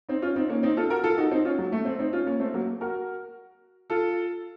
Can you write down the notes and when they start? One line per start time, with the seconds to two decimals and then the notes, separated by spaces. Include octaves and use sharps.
0.09 C4 D#4
0.22 C#4 F4
0.36 C4 D#4
0.49 A#3 C#4
0.63 C4 D#4
0.77 F4 A4
0.90 F#4 A#4
1.04 F4 A4
1.18 D#4 F#4
1.31 C4 D#4
1.45 C#4 F4
1.59 F#3
1.72 A3
1.85 A3 C4
1.99 C4 D#4
2.13 C#4 F4
2.27 A#3 C#4
2.40 A3 C4
2.54 F#3 A#3
2.81 F#4 A#4
3.90 F4 A4